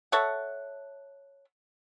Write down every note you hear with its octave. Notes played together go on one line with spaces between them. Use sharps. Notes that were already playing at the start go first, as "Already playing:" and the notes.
A4 C#5 E5 F#5